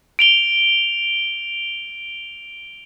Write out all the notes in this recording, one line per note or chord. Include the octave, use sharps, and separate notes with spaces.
D7 F7 G7